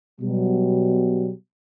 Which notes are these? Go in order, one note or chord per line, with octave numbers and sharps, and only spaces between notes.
B2 F#3 G3